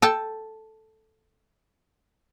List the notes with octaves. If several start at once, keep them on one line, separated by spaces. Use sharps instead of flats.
A4 G5 A5